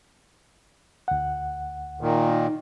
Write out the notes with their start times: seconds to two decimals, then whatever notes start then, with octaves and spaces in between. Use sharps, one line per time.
1.08 D2 F#5
2.01 A#2 D#3
2.29 D#4